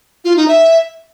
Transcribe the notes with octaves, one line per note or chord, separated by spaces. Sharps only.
F4
D#4
E5